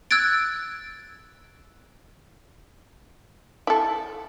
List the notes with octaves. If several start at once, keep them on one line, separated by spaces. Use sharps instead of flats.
E6 F#6 G#6 A6 D7
E4 A4